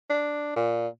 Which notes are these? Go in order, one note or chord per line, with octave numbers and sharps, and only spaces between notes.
D4
A#2